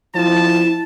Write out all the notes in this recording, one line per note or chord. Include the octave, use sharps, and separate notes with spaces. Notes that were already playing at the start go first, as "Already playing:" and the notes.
F3 E4 A5